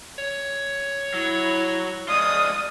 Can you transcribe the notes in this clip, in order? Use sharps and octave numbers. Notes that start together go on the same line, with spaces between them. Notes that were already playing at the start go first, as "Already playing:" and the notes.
C#5
F#3 E4
F3 G#3 F4 D5 D#6